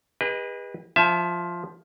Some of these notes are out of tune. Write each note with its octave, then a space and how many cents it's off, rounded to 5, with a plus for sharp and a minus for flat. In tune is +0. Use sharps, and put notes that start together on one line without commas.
G#4 -45 B4 -20 D#5 +0
F3 +5 E5 +15 A5 -40